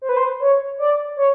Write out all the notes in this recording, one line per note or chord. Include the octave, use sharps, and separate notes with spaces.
C5
B4
C5
C#5
D5
C#5